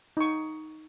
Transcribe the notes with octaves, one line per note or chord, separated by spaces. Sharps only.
D#4 C#6